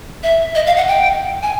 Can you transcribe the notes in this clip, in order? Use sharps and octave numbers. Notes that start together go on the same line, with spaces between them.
E5
D#5
F5
F#5
G5
G#5